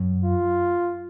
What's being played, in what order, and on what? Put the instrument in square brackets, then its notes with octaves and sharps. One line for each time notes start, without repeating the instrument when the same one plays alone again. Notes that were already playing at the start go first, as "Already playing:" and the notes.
Already playing: [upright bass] F#2
[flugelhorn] F4